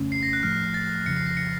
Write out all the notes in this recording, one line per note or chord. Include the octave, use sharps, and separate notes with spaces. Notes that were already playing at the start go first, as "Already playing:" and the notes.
Already playing: F2 C#3 A3 C#4
C7
A#6
F#6
A#1 A2 F3 A3 F6
A6
F2 C#3 F3 C#7
C7
A#6
C#7